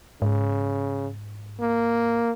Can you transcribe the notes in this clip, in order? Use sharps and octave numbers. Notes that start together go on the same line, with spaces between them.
G#2 C#3
A#3